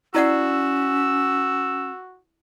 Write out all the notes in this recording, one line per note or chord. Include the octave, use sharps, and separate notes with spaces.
C#4 E4 F#4 D5 F#5 E6